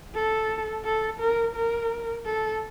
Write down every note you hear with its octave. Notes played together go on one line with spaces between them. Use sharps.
A4
A4
A#4
A#4
A4